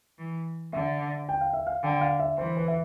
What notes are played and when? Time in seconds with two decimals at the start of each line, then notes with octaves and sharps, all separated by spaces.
0.18 E3
0.73 D3 E5
1.29 G5
1.41 F5
1.53 E5
1.67 F5
1.83 D3 G5
2.01 F5
2.20 E5
2.38 E3 C5
2.57 B4
2.68 E5